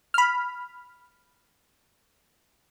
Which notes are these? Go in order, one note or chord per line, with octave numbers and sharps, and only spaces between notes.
B5 F6